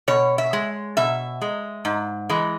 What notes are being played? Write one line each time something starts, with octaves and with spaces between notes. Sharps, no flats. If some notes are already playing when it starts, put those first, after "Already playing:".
B2 C#5
E5
G#3
B2 E5
G#3
G#2
E3 G#3